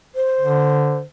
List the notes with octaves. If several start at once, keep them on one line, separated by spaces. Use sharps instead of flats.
C5
D3